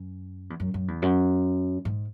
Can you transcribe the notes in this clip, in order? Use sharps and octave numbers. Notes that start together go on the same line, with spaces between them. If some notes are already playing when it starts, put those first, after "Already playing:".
Already playing: F#2
E2
F#2
F#2
E2
F#2
G#2